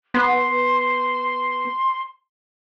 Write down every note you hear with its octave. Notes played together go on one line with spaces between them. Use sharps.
B3 C6